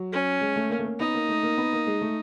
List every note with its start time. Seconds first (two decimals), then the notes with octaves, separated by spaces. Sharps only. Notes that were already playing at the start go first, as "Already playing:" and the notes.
Already playing: F#3
0.12 C#4
0.41 G#3
0.56 A3
0.70 A#3
0.79 A3
0.85 A#3
1.00 B3 D#4
1.14 A#3
1.29 A3
1.43 A#3
1.58 B3
1.73 A#3
1.87 G#3
2.01 A3